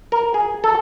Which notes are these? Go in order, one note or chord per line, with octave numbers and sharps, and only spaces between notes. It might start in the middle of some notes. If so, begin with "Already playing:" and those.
A#4
G#4
A4